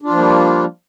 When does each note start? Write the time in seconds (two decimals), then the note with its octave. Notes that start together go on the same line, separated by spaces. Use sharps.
0.01 D4
0.06 F4
0.10 F3
0.14 A#3
0.19 G3